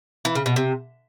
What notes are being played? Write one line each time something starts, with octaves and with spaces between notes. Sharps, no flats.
E3
C#3
B2
C3